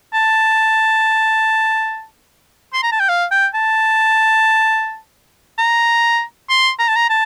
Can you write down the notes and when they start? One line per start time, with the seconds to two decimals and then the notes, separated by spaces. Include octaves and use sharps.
0.14 A5
2.74 C6
2.83 A#5
2.92 A5
3.00 G5
3.09 F5
3.31 G5
3.55 A5
5.58 A#5
6.50 C6
6.79 A#5
6.88 A5
6.96 A#5
7.10 A5